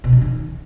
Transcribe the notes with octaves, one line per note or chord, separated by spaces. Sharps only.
B2
E3
D#3